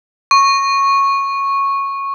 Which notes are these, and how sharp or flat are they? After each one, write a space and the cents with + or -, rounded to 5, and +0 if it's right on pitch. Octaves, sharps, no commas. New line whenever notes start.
C#6 -10